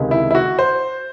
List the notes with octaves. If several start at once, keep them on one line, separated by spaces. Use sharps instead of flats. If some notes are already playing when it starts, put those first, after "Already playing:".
Already playing: C#2 C3 D#3 G#3
E4
E4
F#4
C5